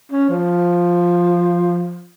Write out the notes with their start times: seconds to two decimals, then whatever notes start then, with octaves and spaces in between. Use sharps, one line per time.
0.12 C#4
0.29 F3